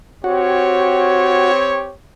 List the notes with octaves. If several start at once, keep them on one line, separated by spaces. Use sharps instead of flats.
C4 F#4 G4 C#5